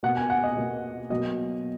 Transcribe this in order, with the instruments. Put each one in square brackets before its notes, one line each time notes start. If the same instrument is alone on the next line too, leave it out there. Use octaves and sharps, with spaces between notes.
[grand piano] B2 A#3 F#5
G#5
F#5
D#5
B2 A#3
B2 F#3 A#3 D#5